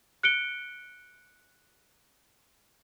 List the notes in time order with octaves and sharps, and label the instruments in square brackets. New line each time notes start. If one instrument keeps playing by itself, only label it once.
[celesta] F#6 C#7 D7 G7